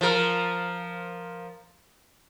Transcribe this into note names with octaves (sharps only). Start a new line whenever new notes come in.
F3 A#4